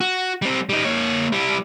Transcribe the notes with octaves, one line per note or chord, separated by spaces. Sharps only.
F#4
G3 C4
G3 D#4
A#3 C#5
G3 E4